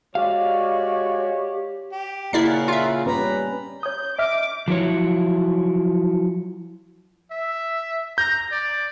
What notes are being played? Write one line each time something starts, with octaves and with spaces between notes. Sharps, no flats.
G#3 F#4 G4 C#5 D5 F5
G4
C#3 A#3 E4 A#4 D5 F#5 C7
F4 E5
G3 C#4 B4 A#5 B5
C#5 D#6 G6
D#5 E5 D6 F6
F3 F#3 E4 C#5
E5
A#5 G6
D5